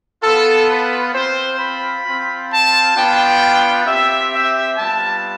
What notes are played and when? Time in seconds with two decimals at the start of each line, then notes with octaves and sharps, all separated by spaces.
0.23 B3 F4 A4
0.69 B4
1.14 C4 F4 C5
1.59 B5
2.06 C4 F4
2.51 A5
2.96 B3 D4 F4 G5
3.86 C4 G4 E5
4.32 E5
4.77 G3 B3 F4 A5